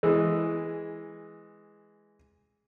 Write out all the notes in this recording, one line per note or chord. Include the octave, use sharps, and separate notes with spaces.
E3 G#3